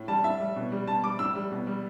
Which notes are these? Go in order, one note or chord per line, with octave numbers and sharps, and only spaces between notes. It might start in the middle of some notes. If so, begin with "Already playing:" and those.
Already playing: A2
G3 A5
A2 E5
G3
B2
G3
B2 A5
G3 D6
A2 E6
G3
B2
G3